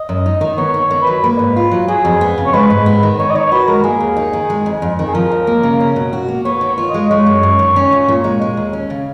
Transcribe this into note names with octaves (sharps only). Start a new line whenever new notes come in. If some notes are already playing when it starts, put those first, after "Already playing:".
Already playing: D#5
F#2
D#4
D#3
B3 C#5
D#3
C#5
D#3
B4
F#3
A#3 B4
G#2
F4
F#3
F#3 G#4
F2
B3
C#3
C#5
G#3 B4
G#2
B3
D#3
D#4 C#5
D#5
D#3 C#5
F#4 B4
G#3 A#4
A#3 G#4
D#2
D#4
D#3
G#3
F2
F2
D#3
G#4
F3 A#4
D#2
A#3
C#3
C#4
B2
F#4
A#3
B3 C#5
D#3
C#5
F4
D#5
G#3
G#3 C#5
F#2
F#2
D#3
C#4
A#2
A#2
G#3
G#3
D#2
C#4
C#3